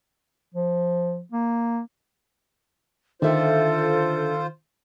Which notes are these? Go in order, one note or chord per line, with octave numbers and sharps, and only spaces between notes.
F3
A#3
D3 D#3 F4 A4 C5 E5 G5